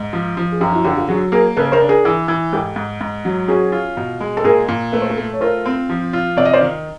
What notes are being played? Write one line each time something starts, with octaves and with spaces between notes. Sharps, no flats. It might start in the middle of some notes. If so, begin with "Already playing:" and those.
Already playing: G#2
F3
F3
G#4
F#2 F4 G4
E4 F#4
D3 F4 G4
F4 G4
F#3 F#4 G#4
A#3 G#4 A#4
C#3 A4 B4
A#4 C5
D4
G#4 A#4
E3
E3
G#2 G4 A4
G#2
G#2
F#3
C#4 F#4 G#4
F4
B2
G#3
A4
A#2 G#4 A#4
A#2
A3 B4
C5
A4 B4
A3
C#5
F4 A#4 C5
C4
F3
F4
C3 D5
D#5
C5 D5
D#3